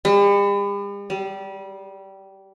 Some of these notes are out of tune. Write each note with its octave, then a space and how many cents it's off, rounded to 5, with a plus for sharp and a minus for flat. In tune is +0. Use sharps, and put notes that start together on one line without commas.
G3 +45
G3 -20